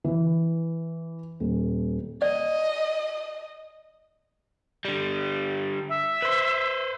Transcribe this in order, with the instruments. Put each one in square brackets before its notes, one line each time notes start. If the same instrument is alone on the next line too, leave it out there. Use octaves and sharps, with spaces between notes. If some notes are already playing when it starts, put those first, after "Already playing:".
[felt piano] E3
D#1
[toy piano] D5 [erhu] D#5
[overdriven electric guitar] D3 G3
[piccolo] E5
[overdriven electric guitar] B4 C5